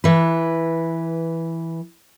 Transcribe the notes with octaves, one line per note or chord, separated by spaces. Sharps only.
E3 B4